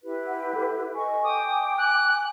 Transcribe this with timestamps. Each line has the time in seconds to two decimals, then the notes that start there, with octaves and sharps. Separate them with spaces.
0.03 E4 G4 B4
0.27 F#5
0.54 A4
0.95 D#5 G#5 C#6
1.24 G5 D6 D#6
1.78 G#5 F#6